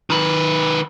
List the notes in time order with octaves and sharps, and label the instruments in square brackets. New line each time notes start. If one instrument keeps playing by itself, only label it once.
[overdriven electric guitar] D#3 B4